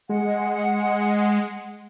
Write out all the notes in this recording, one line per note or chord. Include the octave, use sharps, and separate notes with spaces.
G#3 F#5